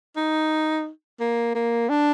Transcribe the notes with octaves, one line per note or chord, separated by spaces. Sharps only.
D#4
A#3
A#3
D4